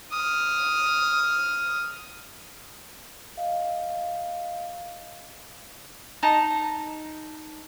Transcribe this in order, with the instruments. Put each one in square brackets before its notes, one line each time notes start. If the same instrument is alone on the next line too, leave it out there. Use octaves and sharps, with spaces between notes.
[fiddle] D#6 F6
[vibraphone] D#5 F5
[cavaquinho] D#4 A5 A#5